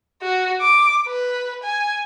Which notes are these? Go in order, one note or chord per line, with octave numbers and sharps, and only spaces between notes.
F#4
D6
B4
G#5